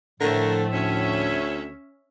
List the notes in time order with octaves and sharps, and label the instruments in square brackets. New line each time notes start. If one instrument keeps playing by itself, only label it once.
[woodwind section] A2 F3 [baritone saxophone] D3 [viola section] A3 [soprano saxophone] A#4
[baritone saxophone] D2 [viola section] C#4 E5 [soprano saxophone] C#5